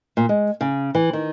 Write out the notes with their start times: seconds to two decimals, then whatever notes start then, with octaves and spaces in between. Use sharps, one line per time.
0.17 A#2
0.29 G#3
0.61 C#3
0.95 E3
1.13 D#3